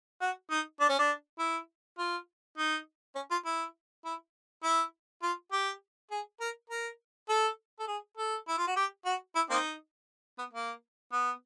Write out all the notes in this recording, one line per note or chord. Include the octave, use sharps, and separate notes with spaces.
F#4
D#4
D4
C#4
D4
E4
F4
D#4
C#4
F4
E4
E4
E4
F4
G4
G#4
A#4
A#4
A4
A4
G#4
A4
E4
F4
F#4
G4
F#4
E4
A#3 C4 D#4
B3
A#3
B3